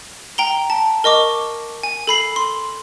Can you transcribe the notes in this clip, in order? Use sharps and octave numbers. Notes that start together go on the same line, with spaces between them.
G5 A#5 G7
A5
A#4 D#5 C#6 D6
G#5
A4 B5 C7
C6